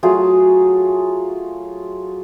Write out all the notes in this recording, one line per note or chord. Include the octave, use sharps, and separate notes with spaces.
F#3 A3 F4 G#4